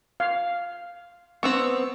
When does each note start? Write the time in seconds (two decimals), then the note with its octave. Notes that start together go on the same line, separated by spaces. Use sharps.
0.20 F5
1.43 B3 C4 C#6 E6